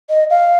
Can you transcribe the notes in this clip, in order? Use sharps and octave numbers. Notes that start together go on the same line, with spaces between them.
D#5
F5